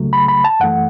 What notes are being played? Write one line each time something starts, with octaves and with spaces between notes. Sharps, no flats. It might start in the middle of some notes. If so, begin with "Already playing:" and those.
Already playing: C#2 C#3 F#3 A3
B5
B5
A5
F#2 E3 A3 F#5